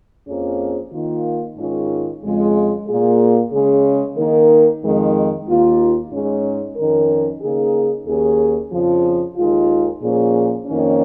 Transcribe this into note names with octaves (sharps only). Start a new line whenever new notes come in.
F2 F3 A#3 C#4 G#4
D#3 A#3 F4
G#2 D#3 C#4 F4 G#4
F2 C#3 G#3 F4
A#2 A#3 F4 G#4
C#3 G#3 C#4 G#4
D#3 A#3 D#4 A#4
F2 D#3 G#3
D#2 D#3 A#3 F4
G#2 G#3 C#4
F2 D#3 C#4 A#4
C#3 A#3 D#4 G#4
D#2 D#3 C#4 G#4
F2 C#3 F3
D#2 D#3 G#3 F4
A#2 F3 C#4 G#4
F2 D#3 A#3 C#4